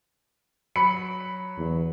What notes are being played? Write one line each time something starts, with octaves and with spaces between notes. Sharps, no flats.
F#3 B5 C#7
E2